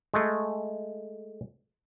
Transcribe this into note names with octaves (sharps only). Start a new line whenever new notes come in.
G#3 A3